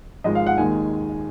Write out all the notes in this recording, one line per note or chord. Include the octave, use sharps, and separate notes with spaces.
G#1 G#2 F3 G#3 D#5
F5
F#5
D#2 D#3 G#3 G#5